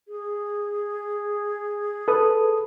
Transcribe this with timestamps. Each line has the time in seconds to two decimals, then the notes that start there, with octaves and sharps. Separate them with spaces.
0.08 G#4
2.08 A4 B4 D#6